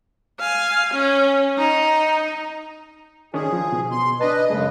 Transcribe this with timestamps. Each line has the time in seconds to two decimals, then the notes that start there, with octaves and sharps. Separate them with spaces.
0.40 F5 G#5
0.93 C#4
1.58 D#4
3.34 D#3 C#4 D4 G#4
3.53 F3
3.73 B2
3.91 C6
4.21 D4 B4 D#5 A5
4.50 F#2 C#3 G#3 A3